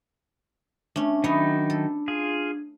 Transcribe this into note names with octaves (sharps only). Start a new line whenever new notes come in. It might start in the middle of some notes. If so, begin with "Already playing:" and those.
A3 C#4 D4
D#3 F#3 D#4 E4 C#5 D#5
A4
F4 G#4